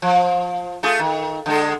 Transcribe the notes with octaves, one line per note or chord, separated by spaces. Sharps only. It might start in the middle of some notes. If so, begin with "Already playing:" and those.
F3
A3 F4 G#4
D#3
D3 G#3 A4